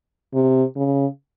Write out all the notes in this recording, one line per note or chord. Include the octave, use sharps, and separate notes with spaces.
C3
C#3